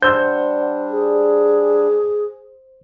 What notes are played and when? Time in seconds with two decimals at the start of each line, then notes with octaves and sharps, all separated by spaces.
0.02 G3 D4 C5 F#5 E6 G6
0.90 G#4